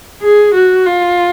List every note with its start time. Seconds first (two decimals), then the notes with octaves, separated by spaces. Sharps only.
0.22 G#4
0.54 F#4
0.87 F4